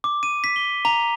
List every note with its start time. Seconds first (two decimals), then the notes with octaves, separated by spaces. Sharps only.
0.04 D6
0.23 D#7
0.44 B6
0.56 G7
0.85 A#5